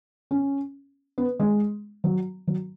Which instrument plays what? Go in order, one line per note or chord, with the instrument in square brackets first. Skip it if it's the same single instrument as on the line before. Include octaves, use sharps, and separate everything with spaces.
[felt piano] C#4
B3
G#3
F#3
F#3